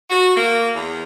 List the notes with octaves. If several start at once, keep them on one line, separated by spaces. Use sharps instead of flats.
F#4
A#3
E2